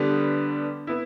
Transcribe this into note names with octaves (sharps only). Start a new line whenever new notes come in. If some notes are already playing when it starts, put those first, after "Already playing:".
Already playing: D3 G3 B3 D4
B3 E4